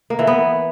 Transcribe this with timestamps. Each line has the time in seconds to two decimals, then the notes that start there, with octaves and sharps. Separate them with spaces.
0.10 A#3
0.19 E3
0.27 B3